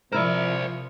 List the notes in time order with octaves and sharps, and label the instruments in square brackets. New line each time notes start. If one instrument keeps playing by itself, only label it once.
[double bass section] C3 F3 [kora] E4 A#4 [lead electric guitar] C5 D5